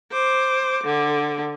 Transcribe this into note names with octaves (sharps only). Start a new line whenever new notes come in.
C5 D6
D3